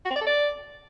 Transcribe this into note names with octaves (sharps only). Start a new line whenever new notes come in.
F#4
C4
D5
A4
D5